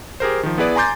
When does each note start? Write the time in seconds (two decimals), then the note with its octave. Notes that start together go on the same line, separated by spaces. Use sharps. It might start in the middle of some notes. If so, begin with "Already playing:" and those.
0.20 G4 G#4 A#4 C5
0.43 D#3 F3
0.58 B3 E4 G#4 B4 D5
0.76 G#5 A#5 C6 D6 G6 A6